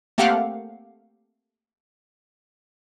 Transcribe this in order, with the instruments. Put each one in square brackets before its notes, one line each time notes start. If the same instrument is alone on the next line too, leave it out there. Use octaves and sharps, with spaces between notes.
[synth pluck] A3 A#3 C4 G4 F5 F#5